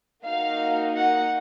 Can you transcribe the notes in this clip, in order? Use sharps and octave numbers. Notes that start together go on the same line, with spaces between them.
A#3 D#4 F#4 F5
F#5